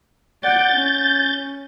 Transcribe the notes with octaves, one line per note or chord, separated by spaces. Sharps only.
D5 F#5 G6 A6
C#4